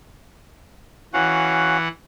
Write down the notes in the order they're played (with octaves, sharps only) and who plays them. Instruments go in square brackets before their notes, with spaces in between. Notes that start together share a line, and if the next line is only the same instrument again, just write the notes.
[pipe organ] E3 F#5 [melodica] C#4 F#4 F5